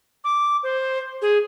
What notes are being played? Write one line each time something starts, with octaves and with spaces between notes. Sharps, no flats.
D6
C5
G#4